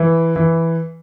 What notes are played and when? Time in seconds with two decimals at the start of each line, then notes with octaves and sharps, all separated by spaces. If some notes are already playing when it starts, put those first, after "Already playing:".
Already playing: E3
0.36 E3